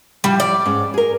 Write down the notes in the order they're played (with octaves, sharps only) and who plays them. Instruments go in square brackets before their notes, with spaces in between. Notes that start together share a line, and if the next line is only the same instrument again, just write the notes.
[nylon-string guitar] A2 F3 [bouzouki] G3
[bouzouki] D5
[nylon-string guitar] G#2 C#4
G#4 A#4